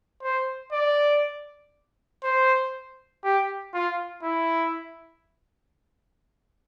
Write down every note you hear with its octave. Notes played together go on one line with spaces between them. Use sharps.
C5
D5
C5
G4
F4
E4